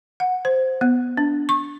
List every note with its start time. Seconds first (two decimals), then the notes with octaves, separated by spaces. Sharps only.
0.20 F#5
0.45 C5
0.81 B3
1.17 D4
1.49 C#6